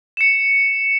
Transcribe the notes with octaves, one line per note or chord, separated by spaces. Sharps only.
C#7 E7